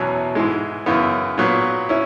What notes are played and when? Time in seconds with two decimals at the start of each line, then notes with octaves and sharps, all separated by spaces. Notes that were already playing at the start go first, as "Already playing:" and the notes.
Already playing: E2 B2 F#3 C#4 E4
0.35 G#2 E3 G#3
0.86 F#2 C#3 E3 B3
1.38 A#2 F#3 B3
1.89 C#4 E4